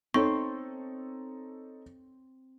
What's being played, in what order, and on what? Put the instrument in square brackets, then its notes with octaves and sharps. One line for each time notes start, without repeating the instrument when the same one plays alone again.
[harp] C4 [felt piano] D#4 A4 C#5 [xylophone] C#6